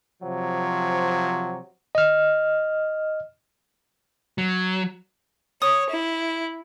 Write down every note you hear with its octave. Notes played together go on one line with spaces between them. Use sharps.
C3 F3 F#3
D#5 F6
F#3
C#5 D#6
E4